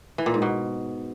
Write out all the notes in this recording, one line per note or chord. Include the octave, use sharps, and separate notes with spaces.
E3
A#2
G#2
B2